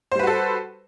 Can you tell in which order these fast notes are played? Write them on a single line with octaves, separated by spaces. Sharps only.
C5 G3 B4 F#4 A4